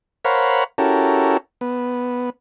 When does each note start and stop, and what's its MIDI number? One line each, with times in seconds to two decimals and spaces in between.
0.25 0.64 70
0.25 0.64 72
0.25 0.64 73
0.25 0.64 77
0.25 0.64 78
0.25 0.64 83
0.78 1.37 61
0.78 1.37 64
0.78 1.37 66
0.78 1.37 67
0.78 1.37 69
0.78 1.37 70
1.61 2.30 59